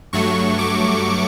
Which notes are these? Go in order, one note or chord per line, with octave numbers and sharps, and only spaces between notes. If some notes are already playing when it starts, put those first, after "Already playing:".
G2 F#3 A3 C#6
D6